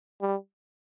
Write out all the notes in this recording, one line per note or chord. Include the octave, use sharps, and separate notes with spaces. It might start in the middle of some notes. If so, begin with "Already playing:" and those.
G3